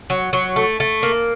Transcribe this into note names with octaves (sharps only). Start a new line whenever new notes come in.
F#3
F#3
A3
A3
A#3